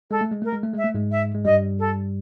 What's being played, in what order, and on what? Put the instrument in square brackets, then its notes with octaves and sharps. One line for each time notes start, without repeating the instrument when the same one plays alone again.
[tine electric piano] G#3 [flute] A4
[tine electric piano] A3
G#3
[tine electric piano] A3 [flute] A#4
[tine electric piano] G#3
A3
[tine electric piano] G#3 [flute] E5
[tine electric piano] A3
G#2 G#3
[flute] E5
[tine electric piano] G#3
[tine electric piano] G2 G3 [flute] D#5
[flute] A4